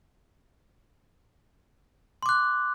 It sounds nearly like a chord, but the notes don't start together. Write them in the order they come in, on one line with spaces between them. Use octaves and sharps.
C6 D6 F#6